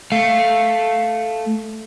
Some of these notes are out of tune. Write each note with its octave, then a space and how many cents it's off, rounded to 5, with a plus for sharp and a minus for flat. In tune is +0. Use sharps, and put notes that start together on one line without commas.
A3 +0 F5 +0